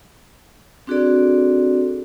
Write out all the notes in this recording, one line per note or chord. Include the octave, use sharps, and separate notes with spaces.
C4 D4 F#4 G#4 A4 D5